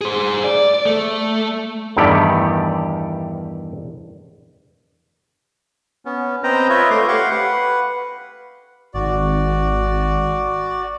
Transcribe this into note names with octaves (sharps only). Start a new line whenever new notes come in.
G#4 C5
D5
A3
E2 G2 D#3 A3 G4 D5
B3 C#4
C4 B4 C5 D#5 G5 A#5
F4 B4 C#5 D#5 E5
A3 C6 D6
G4 F5 F#5 C6 C#6
B4 F#5
G#1 F#4 D5